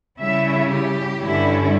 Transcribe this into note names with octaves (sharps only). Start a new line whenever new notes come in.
C#3 G3 C#4 E4 E5
G4
G2 D3 G3 C#4 E4